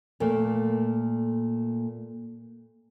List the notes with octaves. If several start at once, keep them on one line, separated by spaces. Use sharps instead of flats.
A#2 A3 A#3